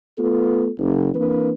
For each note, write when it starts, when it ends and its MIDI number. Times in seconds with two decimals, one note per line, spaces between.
0.19 0.69 57
0.19 0.69 59
0.19 0.69 65
0.19 0.69 69
0.78 1.10 30
1.15 1.51 52
1.15 1.51 58
1.15 1.51 60
1.15 1.51 62
1.15 1.51 71